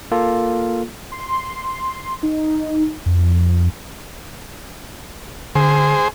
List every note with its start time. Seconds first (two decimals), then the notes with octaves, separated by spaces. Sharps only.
0.11 A#3 F4 A4
1.12 C6
2.23 D#4
3.06 F2
5.55 D3 G#4 C5